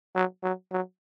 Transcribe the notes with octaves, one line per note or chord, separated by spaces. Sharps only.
F#3
F#3
F#3